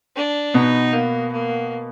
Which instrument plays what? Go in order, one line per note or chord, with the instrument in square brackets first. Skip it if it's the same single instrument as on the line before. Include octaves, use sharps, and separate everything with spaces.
[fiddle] D4
[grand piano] B2 B3 [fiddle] D#4
[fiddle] A#3
A#3